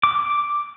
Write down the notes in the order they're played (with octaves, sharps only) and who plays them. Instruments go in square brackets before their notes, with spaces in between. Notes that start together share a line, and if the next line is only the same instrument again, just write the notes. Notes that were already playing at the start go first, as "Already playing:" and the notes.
[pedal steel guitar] D6